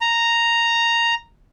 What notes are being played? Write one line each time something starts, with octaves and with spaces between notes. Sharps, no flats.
A#5